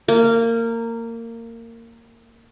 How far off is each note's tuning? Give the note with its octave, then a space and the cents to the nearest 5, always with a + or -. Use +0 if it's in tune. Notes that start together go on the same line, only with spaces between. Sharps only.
A#3 -20